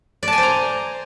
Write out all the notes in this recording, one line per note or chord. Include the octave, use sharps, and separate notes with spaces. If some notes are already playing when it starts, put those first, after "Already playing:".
D5
A5
G#5
C5
A#5